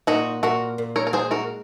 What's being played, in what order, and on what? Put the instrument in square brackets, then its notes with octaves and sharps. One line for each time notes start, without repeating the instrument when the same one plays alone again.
[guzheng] A#2 [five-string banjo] D#4 F#4
[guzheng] A#2 [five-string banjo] F#4 A#4
[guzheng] A#2
[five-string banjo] A#4 C#5
A#4
[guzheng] G#3 [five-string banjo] G#4 C5
[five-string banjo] F#4 A#4